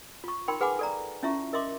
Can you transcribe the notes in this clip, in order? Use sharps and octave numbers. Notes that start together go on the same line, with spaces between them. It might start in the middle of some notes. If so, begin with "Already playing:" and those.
F4 C#6
D#4 A#4 G5 B5 C6
G#4 B4 F#5 G#5 B5 D6
A4 D5 A#5
C#4 E4 F4 E5 A#5 C#6
A#4 D#5 E5 C6 D6